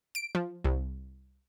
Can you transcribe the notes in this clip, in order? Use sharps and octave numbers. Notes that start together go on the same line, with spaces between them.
D7
F3
C2